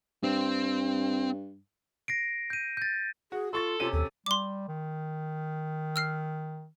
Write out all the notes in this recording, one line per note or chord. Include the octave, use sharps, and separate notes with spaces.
G2 C4
A#6 C7 D7
G6 D#7
G6 A6
F#4 G#4
F4 A4 C6 C#6 A6
C3 C#4 F4 D#7
D#2 A4
G3 C6 D6
D#3
E6 F6 C7